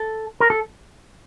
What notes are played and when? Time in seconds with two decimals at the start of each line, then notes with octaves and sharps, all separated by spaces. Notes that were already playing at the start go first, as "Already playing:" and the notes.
Already playing: A4
0.40 A#4
0.50 A4